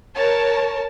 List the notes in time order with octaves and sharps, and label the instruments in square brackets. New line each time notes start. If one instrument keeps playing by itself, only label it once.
[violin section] A#4 C#5 A5